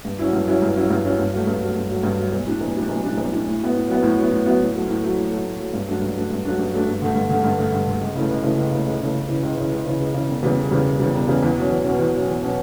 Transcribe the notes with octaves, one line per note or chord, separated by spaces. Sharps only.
G2
F#3 C#4 E4
G2
F#3 C#4 E4
G2
F#3 C#4 E4
G2
F#3 C#4 E4
G2
F#3 A3
G2
F#3 A3
G2
F#3 A3
G2
F#3 A3
B1
A2 G3 D4
B1
A2 G3 D4
B1
A2 G3 D4
B1
A2 G3 D4
A2
F#3 B3
A2
F#3 B3
A2
F#3 B3
A2
F#3 B3
A2
F#3 A3
A2
F#3 A3
A2
F#3 A3
A2
F#3 A3
G2
F#3 A3 D4
G2
F#3 A3 D4
G2
F#3 A3 D4
G2
F#3 A3 D4
G2
D3 A3
G2
D3 A3
G2
D3 A3
G2
D3 A3
C#2
C#3 E3 A3
C#2
C#3 E3 A3
C#2
C#3 E3 A3
C#2
C#3 E3 A3
C#2
C#3 E3
C#2
C#3 E3
C#2
C#3 E3
C#2
C#3 E3
E1
E2 C#3 G3
E1
E2 C#3 G3
E1
E2 C#3 G3
E1
E2 C#3 G3
E2
B2 F#3 C#4
E2
B2 F#3 C#4
E2
B2 F#3 C#4
E2
B2 F#3 C#4